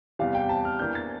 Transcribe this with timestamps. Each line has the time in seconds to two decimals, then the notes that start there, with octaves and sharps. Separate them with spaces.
0.19 E2 C3 E3 G3 F5
0.35 G5
0.49 A5
0.65 F6
0.79 E2 E3 A#3 D4 G6
0.95 A6